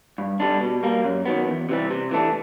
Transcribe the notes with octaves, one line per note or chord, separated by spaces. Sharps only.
G2
D3 G3 B3 D4
B2
G3 A#3
F#2
D#3 F#3 B3
E2
C3 E3 G3
C3
E3 A3 D4